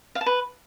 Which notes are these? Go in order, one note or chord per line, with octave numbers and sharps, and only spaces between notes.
F5
A5
B4